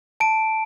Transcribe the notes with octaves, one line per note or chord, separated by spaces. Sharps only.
A5 D7